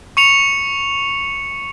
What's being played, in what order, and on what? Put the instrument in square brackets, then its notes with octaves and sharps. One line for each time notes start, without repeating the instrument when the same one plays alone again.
[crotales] C#6 C#7 F7